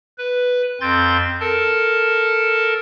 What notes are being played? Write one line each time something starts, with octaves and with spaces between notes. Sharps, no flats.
B4
F2 C4 C6 G6 A6
A4 A#4 A5